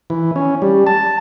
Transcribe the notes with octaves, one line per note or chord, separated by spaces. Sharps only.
E3
C#4
G3
A5